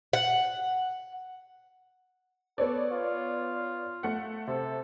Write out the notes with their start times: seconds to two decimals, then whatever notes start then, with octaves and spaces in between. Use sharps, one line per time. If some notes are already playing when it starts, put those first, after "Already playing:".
0.13 F#5
2.58 B3 A4 C#5 D5
2.92 F4
4.03 A3 F#5
4.47 C3 A4